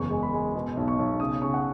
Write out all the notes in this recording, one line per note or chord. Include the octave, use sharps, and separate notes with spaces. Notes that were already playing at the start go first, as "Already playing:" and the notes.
Already playing: F#1 E2 C#6
G#3
B5
G#3
B2
B1
C#6
B1
C#3 D#6
C#3 C#6
F#5